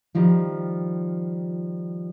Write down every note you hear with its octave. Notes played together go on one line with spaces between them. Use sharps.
D#3 F3 G3